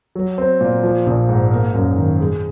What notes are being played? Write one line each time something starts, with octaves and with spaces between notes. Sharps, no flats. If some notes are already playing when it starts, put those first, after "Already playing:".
F#3
C4
A#2
F3
A#1
G#2
A#3
F#2
D#3
G#3